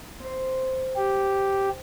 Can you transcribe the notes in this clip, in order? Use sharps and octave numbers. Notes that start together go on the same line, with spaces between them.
C4 C5
G4